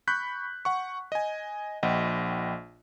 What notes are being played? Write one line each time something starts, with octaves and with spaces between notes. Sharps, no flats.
B5 C#6 F#6 G6 B6
F#5 C#6
D#5 G#5
A#1 D#5 F#5 G5